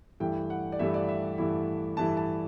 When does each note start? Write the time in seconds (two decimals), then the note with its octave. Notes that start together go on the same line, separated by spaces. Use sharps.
0.20 G2 E3 A3 E4 G5
0.50 F#5
0.72 D5
0.79 G2 E3 A3 E4 E5
0.94 D5
1.09 E5
1.38 G2 E3 A3 E4
1.97 G2 E3 A3 E4 A5
2.17 A5